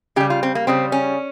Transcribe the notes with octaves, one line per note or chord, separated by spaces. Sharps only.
C#3 G3 G4
F4
C4
A#3
C#3 G3 C4
C#4